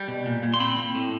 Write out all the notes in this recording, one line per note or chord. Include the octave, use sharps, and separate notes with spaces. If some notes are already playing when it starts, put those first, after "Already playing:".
Already playing: G3
B2
A#2
A#2
C6
C4 B5
C4
A2